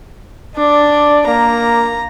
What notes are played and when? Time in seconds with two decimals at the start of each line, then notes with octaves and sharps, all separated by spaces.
0.56 D4 D5
1.27 A#3 A#5